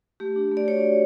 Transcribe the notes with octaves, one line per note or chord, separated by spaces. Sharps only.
A3 G4
D4
A3
D5
F#4 C#5
A3